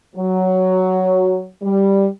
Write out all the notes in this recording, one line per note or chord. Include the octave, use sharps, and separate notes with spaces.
F#3
G3